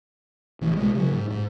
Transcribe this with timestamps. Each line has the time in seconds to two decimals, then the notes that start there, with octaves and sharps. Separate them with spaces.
0.61 A#1 E3
0.76 B1 G#3
0.95 C#3 F#3
1.11 G#2
1.31 G#2